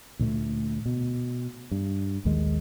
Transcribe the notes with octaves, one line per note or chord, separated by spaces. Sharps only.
D2 A#2 G#3 A3
B2
G2
A#1 D#2 D#3 G#3